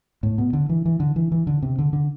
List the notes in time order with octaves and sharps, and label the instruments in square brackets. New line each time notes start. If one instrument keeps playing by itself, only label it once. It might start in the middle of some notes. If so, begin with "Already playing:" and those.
[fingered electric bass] A2
B2
D3
E3
E3
D3
E3
E3
D3
C3
D3
D3